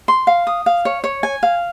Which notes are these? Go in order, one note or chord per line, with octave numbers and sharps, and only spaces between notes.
C6
F5
D#6
F5
C#5
C#5
G#5
F5